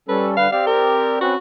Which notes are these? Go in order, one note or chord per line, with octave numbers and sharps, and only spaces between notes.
G3 C#4 A4 B4
D3 G3 B4 F5
C4 G4 D5 F5
A#4
C4 C#4 F#4 B4